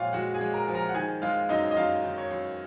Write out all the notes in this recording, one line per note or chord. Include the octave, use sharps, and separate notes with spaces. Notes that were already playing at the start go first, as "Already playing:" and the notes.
Already playing: A#2 F3 G#3 F4 C#5 F5 F#5
G#3 F#4 F#5
G#4 G#5
G#3
A#4 A#5
F3
A#4 A#5
F#5
D#3 G#4 G#5
G#3 F4 F5
F#2 D#4 D#5
D#5
F#2 F4 F5
D#3
C#5
F#2